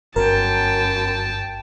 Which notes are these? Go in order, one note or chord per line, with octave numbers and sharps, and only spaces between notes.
G1 F#2 A#4 G5 A5